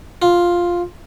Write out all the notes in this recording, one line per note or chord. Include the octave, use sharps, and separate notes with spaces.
F4